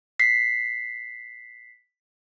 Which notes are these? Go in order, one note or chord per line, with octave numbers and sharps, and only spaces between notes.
B6 C7